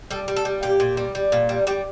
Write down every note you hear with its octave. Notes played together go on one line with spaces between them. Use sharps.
G3 A4
G3
A4
G3
A#2 G4
A#2
G3
G3
A#2
G3
G3 G4